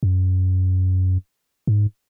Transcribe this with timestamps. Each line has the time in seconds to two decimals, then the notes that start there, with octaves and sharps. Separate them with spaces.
0.03 F#2
1.67 G#2